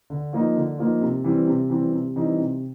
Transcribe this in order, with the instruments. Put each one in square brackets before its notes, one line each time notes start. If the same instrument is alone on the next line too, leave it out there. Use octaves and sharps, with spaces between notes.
[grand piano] D3
F3 A#3 D#4
D3
F3 A#3 D#4
C3
E3 G3 C4
C3
E3 G3 C4
C3
E3 G3 C4 D#4
C3